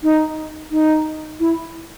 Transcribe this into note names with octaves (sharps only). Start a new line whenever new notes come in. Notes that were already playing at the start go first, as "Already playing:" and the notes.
D#4
D#4
E4